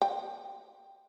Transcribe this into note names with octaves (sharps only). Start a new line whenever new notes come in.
G5